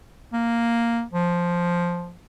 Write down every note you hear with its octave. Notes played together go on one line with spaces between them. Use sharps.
A#3
F3